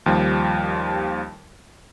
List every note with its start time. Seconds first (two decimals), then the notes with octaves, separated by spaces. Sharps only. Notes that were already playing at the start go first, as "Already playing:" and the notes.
0.06 D#2 F3 G3